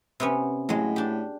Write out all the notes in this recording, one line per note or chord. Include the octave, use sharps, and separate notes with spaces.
C3 B3 C#4
A2 F#3 G#3
D4 G4